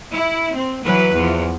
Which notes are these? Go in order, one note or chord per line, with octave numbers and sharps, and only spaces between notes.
E4
C4
E3 F#3 B4
E2 F3